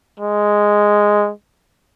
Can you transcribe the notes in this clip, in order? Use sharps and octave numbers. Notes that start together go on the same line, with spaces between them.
G#3